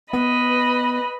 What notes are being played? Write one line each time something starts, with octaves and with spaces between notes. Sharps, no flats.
B3 B4 D#5 B5